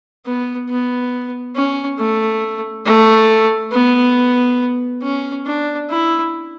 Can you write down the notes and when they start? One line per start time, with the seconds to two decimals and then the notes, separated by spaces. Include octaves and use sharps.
0.26 B3
0.69 B3
1.55 C#4
1.99 A3
2.85 A3
3.72 B3
5.03 C#4
5.46 D4
5.90 E4